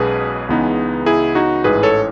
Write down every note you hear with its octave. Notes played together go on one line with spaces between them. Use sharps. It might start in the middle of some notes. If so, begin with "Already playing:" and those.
Already playing: B1 B2 G#3 C#4 G#4 B4
C#2 C#3 E3 B3 D#4
E4 G#4
D#4 F#4
A1 G#2 E3 G#4 B4
A4 C#5